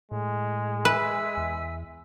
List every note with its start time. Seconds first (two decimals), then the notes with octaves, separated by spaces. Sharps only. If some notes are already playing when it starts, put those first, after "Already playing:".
0.12 A2 G#3
0.85 B4 E5 G#5 E6
1.37 E2